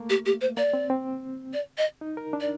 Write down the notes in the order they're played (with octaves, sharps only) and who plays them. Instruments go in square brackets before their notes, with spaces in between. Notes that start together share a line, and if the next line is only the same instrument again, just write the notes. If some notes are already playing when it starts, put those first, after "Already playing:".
Already playing: [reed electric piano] A3 A#3
[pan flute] G4
G4
C5
[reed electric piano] A#3 [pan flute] D5
[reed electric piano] C4
C4
[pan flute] D5
D#5
[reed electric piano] D#4
A#4
D4
[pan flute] D5